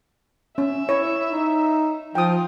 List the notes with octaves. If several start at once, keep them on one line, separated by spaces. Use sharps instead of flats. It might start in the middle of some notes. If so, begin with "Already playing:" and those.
C#4 E5
E4 C#5
D#4
F3 F4 G5 D#6